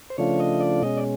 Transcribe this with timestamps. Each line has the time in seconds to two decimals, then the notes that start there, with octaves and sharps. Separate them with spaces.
0.10 C5
0.18 C#3 F3 A3 D4 F4 C#5
0.40 D#5
0.61 D5
0.82 B2 G#3 C#4 D#5
0.98 D5